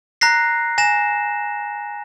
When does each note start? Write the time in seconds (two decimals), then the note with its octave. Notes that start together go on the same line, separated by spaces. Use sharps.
0.21 A#5 F#6 A#6 C7
0.78 G#5 A#6 E7